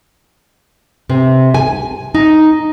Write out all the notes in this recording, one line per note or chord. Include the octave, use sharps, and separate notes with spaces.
C3
G#5
D#4